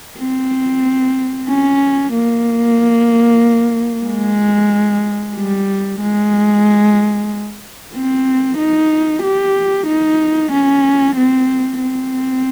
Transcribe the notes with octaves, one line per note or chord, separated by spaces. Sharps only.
C4
C#4
A#3
G#3
G3
G#3
C4
D#4
G4
D#4
C#4
C4
C4